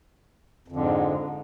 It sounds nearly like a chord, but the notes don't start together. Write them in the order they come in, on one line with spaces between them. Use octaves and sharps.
F2 D3 G#2